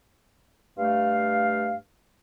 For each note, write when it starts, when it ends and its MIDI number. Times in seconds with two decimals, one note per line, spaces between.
0.78 1.76 43
0.78 1.76 57
0.78 1.76 77